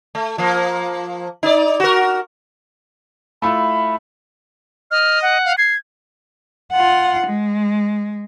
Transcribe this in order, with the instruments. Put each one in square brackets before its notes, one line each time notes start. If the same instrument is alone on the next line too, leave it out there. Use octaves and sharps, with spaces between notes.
[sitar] A3
F3 A#3
D#4 D5
F#4 A#4
[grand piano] A3 E4 F4 [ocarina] B5
[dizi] D#5 [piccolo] F6
[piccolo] F#5
[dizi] F5
[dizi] G#6 [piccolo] C7
[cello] F4 F#5
G#3